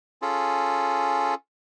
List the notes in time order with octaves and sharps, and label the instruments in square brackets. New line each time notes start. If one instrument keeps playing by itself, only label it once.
[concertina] C#4 F4 G#4 A4